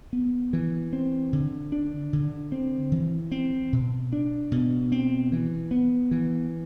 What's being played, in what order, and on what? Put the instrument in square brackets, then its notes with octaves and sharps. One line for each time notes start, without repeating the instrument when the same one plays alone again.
[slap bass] B3
E3
C4
D3
D4
D3
C4
E3
C4
B2
D4
B2
C4
E3
B3
E3